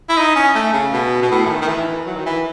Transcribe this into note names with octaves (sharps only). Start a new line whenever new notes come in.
E4
D#4
C#4
A3
C#3
B2
B2
A2
E3
D#3
D#3
E3
F#3
D#3
E3